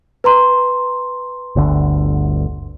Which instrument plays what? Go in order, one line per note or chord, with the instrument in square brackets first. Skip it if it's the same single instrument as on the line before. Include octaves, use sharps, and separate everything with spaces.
[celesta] B4 A#5 C6
[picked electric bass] G1 D2 D3